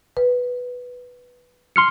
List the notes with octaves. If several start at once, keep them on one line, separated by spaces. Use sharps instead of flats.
B4
C6 F6 C#7